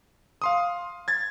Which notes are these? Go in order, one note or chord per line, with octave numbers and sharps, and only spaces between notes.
F5 C6 D#6
G#6 A6